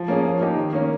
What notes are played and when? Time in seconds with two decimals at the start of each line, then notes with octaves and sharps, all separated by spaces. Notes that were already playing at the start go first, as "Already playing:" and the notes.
Already playing: F3
0.08 A#3 C#4 G#4
0.25 F3
0.41 A#3 D#4 G4
0.57 D#3
0.73 A#3 C#4